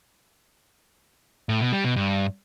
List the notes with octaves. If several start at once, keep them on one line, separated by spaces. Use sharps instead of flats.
A2
B2
G3
B2
G2